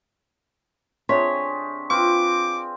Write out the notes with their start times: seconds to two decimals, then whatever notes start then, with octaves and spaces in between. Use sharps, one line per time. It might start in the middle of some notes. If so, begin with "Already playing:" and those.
1.09 C3 D4 G#4 C#5 C6 C#6 B6
1.90 C4 F4 B4 D6